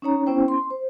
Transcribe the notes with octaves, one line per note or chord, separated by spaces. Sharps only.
C#4 D#4 C#5 A#5
B3 C#4 E4 C5 G5
C6
C5